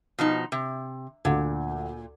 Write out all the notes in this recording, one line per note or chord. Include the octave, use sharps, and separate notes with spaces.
B2 F3 D#4
C3
D2 A#2